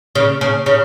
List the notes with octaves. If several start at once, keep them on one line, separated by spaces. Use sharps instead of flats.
C#3
C#3
C#3